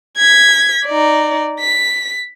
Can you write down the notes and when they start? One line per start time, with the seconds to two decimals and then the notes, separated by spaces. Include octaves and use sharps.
0.17 G#6 B6
0.86 D#4 D5
1.60 B6